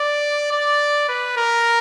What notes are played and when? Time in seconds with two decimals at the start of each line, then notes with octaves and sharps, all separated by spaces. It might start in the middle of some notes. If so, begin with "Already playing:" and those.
Already playing: D5
0.51 D5
1.08 B4
1.37 A#4